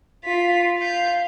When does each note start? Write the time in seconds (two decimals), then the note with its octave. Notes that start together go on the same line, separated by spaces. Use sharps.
0.24 F4 B6
0.78 F5 G6